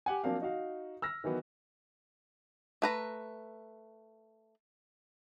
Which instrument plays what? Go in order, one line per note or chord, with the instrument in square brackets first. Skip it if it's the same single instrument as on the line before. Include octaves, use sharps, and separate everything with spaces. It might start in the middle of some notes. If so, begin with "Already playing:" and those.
[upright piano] G4 F#5 G#5
F3 F#3 A#3 C4 D4 F5
D#4 F#4 F5
E6 F6 A#6
D#3 E3 F#3 B3
[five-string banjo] A3 B4 A#5